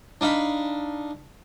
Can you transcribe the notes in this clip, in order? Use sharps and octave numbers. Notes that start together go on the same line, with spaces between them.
D4 D#4 F5 B5